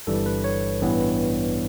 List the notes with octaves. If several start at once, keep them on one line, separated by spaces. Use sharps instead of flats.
G1 G2 E3 G3 A4
B4
C#5
A1 G2 E3 B3